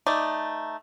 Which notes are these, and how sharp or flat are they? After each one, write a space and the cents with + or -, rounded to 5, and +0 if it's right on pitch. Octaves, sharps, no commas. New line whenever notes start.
A3 +0 D#4 +0 D5 +0